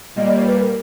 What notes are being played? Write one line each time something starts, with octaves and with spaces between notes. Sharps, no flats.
A#2 G3 A#3 D#5
D5
C#5
B4
A#4